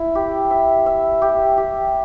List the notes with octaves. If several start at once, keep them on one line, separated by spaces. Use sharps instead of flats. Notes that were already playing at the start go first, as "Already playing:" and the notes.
Already playing: E4
G4
E5
E5
G4
G4